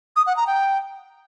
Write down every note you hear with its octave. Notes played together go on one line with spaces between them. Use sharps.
D#6
F#5
A#5
G5